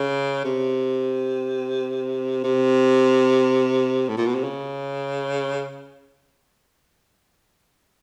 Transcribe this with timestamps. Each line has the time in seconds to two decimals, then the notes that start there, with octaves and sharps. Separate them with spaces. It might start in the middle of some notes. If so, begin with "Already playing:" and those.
Already playing: C#3
0.45 C3
2.44 C3
4.09 A2
4.17 A#2
4.26 B2
4.35 C3
4.44 C#3